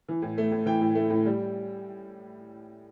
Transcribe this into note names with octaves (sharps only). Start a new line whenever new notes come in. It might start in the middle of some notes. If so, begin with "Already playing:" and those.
E3
A2
A3
A2
E3 G5
A2
A3
A2
G3